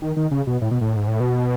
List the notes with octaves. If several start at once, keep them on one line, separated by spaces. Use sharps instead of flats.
D#3
D#3
C#3
B2
A2
B2
A2
G#2
A2
B2